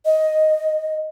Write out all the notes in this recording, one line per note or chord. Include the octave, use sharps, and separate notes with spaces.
D#5